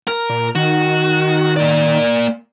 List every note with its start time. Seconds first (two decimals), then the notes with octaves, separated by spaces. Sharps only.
0.08 A#4
0.30 A#2
0.55 D#3 F#4
1.57 A#3 D5